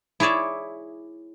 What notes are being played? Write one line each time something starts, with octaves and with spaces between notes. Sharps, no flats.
E4 G#4 C#5 D5 E5